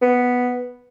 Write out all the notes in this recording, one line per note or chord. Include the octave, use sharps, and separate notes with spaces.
B3